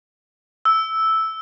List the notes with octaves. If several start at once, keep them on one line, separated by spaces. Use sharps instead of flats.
E6